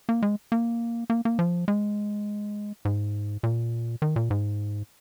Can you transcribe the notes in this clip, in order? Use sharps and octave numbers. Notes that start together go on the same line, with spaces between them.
A#3
G#3
A#3
A#3
A#3
F3
G#3
G#2
A#2
D#3
A#2
G#2